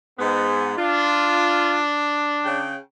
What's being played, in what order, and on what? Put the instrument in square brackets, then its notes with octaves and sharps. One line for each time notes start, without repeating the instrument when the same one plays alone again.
[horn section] G#2 B3
[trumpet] D4 [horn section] F4
[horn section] C#3 G5